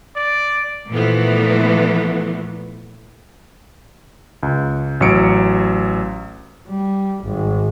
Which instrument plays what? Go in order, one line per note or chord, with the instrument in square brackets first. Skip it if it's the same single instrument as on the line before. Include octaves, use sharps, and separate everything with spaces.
[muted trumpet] D5
[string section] A#2 E3 F3 A3 B3
[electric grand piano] C#2
A1 F#3 C#7 D7
[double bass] G3
G#1